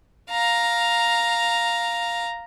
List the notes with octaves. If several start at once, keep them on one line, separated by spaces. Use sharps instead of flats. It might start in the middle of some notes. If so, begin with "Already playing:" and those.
F5 A#5